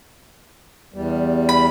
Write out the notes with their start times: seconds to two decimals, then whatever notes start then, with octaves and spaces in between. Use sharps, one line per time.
0.94 E2 G3
1.49 B5